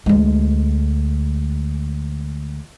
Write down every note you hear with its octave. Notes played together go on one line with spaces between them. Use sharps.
D2 G#3